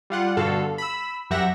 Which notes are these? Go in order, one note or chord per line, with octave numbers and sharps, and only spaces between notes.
G3 F4 F#5
G2 B2 D3 F#4 A4 F5
B5 E6
F#2 F#3 G4 E5 F#5 A#6